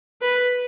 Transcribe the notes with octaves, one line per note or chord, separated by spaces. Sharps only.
B4